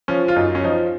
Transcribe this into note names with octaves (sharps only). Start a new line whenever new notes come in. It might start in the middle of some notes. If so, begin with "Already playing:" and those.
F3 C#4
F4
F#2 D#4
C#4
F3 D#4